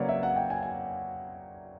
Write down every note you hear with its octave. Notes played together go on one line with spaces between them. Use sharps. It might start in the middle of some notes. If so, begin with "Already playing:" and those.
Already playing: C#3 F#3 A#3 B4 C#5 D5
E5
F#5
G5
G#5
G#5